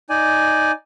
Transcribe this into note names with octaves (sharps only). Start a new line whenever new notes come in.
D#4 D5 G#5